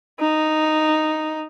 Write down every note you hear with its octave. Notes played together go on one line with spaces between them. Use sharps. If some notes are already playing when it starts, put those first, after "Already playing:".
D#4